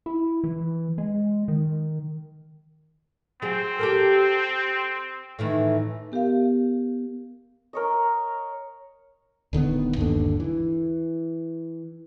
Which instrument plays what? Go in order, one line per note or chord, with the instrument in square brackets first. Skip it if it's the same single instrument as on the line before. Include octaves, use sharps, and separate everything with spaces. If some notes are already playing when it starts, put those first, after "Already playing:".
[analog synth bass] E4
E3
G#3
D#3
[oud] F#3 G#4 [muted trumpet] C4
[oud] G4 A4 A#4
A2 D#3 E3
[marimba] B3 G4 A#4 F5
[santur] A#4 C#5 D#5
[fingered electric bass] D1 D3 D#3 B3
G1 D#2 D3
E3